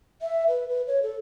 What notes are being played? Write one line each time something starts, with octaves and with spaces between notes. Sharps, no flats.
E5
B4
B4
C#5
A4